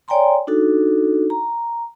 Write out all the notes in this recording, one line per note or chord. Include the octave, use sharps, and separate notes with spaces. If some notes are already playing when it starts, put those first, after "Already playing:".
C#5 D5 G5 G#5 A#5 C6
D4 D#4 F#4 A4
A#5